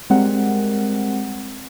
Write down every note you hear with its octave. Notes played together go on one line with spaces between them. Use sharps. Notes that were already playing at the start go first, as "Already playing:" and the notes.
G3 G#3 C4 A#4 F#5